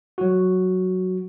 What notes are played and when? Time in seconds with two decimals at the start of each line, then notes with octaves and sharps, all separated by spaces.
0.18 F#3 F#4